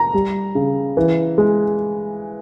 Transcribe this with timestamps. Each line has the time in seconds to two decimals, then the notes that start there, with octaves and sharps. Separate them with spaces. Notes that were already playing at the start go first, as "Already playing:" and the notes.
Already playing: A#5
0.14 G3
0.55 C#3
0.97 E3
1.38 G#3